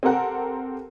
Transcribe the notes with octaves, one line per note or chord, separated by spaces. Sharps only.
C4 G4 A4 A#4 F#5 A#5